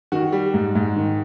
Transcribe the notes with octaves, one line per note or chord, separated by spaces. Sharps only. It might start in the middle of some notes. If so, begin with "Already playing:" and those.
D#3 F#4
G3
G#2
G#2
D#3